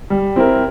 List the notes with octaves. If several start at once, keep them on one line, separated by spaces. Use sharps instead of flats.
G3
C4 E4 A#4